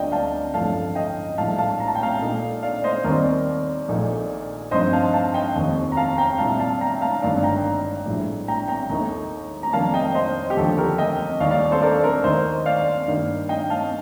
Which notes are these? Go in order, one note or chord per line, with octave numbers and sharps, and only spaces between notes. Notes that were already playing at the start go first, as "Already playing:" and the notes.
Already playing: D2 D3 G3 D4 F4 D5 D#5 G5
F5 A5
A1 G2 F3 A3 F5 A5
D#5 G5
A#1 A2 G3 F5 A5
F5 A5
A#5
A5
G5
F5 A5
A#2 A3 D#4
D5 F5
C5 D#5
D#2 D#3 G3 C4 A#4 D5
A#1 A#2 A3 D#4
G2 F3 C4 D#4 C5 D#5
F5 A5
F5 A5
D#5 G5
F1 D#2 D#3
A#5
F5 A5
G5 A#5
C2 A#2 G3 F5 A5
F5 A5
G5 A#5
F5 A5
G1 G2 D#3 A#3 D#4 D5 F5
G5 A#5
A#1 A2 G3 D4
G5 A#5
G5 A#5
D#2 D#3 A3 D#4
A#5
F1 F2 D#3 G3 A#3 F5 A5
D#5 G5
C5 D#5
G4
D#2 D3 F3 A4
G4 A#4
D#5 G5
D#2 D#3 G3 D5 F5
D5 F5
A4 C5
A#4 D5
A#4 D5
D#2 D#3 A#3 C5 D#5
D5 F5
G2 D#3 G3 A#3 D#4
D#5 G5
F5 A5